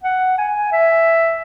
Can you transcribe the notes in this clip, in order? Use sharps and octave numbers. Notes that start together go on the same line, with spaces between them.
F#5
G#5
E5